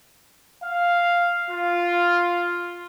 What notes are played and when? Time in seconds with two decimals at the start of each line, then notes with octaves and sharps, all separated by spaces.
0.64 F5
1.50 F4